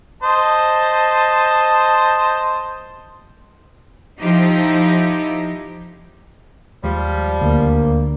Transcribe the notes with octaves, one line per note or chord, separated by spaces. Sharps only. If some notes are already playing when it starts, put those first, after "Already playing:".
C5 D#5 A5
F3 D#4 E4 G4
D#2 F3 G3 G#3
D2 A#3